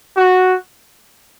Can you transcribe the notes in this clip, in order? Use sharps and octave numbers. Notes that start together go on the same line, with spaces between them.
F#4